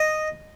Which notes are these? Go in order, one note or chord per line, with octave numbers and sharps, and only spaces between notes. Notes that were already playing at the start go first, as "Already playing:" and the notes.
Already playing: D#5